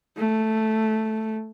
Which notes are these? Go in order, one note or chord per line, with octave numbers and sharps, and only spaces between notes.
A3